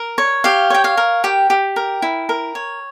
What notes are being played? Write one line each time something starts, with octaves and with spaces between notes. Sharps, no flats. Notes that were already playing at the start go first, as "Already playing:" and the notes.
Already playing: A#4
C#5
G4 F5
C#5 G5
F5
A#4
G4 G5
G4
A#4
E4
A#4
C#5